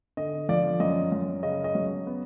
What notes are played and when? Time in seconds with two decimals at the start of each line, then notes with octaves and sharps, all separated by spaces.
0.17 D3 D#5
0.49 F3 D5
0.80 F#2 D#5
1.12 F#2
1.43 C#3 D#5
1.64 D#5
1.75 F#3
2.07 B3